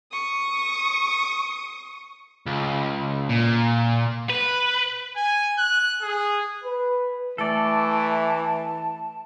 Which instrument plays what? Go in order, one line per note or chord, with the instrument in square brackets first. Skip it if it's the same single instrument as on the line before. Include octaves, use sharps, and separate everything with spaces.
[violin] C#6 D#6
[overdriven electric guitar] C#2
A#2
[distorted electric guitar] B4
[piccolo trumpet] G#5
F#6
G#4
[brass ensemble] B4
[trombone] E3 [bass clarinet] A3 [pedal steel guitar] A4 D5 [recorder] A5